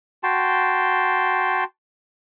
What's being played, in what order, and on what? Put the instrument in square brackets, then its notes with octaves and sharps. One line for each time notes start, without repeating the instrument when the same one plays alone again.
[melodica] F#4 G5 A5 C6